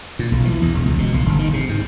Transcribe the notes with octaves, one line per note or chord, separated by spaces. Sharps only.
A#2
B1
E3
E2
E1
C#2
B2
B1
G1
D#3
C3
G#2